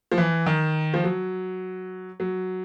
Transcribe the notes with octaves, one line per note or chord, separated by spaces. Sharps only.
F3
E3
D#3
F3
F#3
F#3